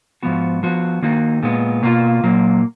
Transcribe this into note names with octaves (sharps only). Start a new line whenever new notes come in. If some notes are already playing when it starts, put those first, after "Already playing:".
G#2 F3 B3 F#4
F3 B3 F#4
D#3 A#3 D#4 F#4
A#2 G#3 B3
B2 A#3 F4
A#2 F#3 A#3